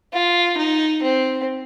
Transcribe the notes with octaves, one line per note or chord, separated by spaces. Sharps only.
F4
D#4
C4